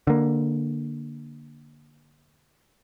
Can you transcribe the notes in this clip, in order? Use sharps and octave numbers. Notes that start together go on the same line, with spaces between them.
D3 A#3